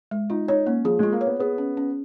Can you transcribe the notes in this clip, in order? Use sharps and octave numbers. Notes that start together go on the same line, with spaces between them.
G#3
D#4 F4
D#4 C#5
A#3 C#4
F3 G#4
G#3 F4
A#3
C#5
B3
B3 G#4
C#4
C#4